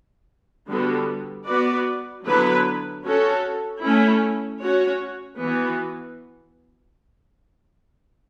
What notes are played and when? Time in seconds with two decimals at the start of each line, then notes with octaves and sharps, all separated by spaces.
0.67 D3 G3 B3 F#4 A4
1.47 B3 F#4 B4 D5
2.25 D3 F#3 B3 E4 B4
3.04 C#4 F#4 A4
3.83 A3 C#4 E4
4.62 C#4 F#4 C#5
5.41 E3 B3 F#4